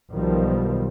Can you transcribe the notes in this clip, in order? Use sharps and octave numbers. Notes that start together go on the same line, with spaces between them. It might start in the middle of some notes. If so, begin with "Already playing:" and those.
B1 B2 D#3 F3 G3